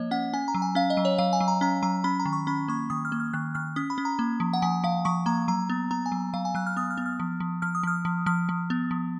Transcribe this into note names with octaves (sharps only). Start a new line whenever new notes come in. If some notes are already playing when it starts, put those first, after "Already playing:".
Already playing: F3 A#3 C#5 D#5
C#4 F#5
C#4 G#5
A#5
F#3
G#5
C#4 F5
D#5
F#3
C#5
F#3 F5
G#5
F#3
A#5
C#4 A#5
F#3 A#5
C#4 B5
A#5
D#3
C#6
C#4 B5
A#3 C#6
D#3 D#6
F6
A#3
F6
D#3 F#6
D#3 F6
C#4 D#6
B5
C#4
A#5
A#3
F3
F#5
F3 G#5
F3 F5
F3 C#6
A#3 A#5
F#3 A#5
B3
B3 A#5
G#5
F#3
F#3 F5
G#5
F#3 F#6
F6
B3 D#6
F6
B3
F6
F3
F3
F3 F6
D#6
F3 F6
F3
F3 F6
F3
B3
F3